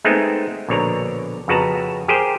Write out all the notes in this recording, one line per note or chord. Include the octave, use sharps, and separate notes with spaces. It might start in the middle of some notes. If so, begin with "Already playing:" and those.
G#3 A3 B3 C4 D#4
A#1 B2 D3 C#5 D5 A#5
F2 C#3 F#4 B4 A5 A#5
G4 G#4 A#4 C5 G5